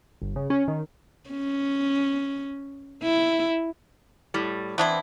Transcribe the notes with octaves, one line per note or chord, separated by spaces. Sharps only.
G1
C#3
C#4
D#3
C#4
E4
A2 G3
E3 B3 C4 D4 E4